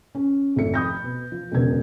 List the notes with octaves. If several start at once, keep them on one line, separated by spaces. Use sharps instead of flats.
C#4
G#1 F2 A3 C#7
B5 D#6 G6 A#6
B2
F3
E1 C#2 B2 B3 G#6